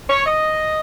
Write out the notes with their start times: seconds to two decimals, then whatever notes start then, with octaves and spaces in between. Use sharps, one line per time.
0.10 C#5
0.25 D#5